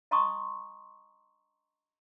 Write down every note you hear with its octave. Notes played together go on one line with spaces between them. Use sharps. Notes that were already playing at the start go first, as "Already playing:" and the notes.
D#5 A5 A#5 C6 C#6 D#6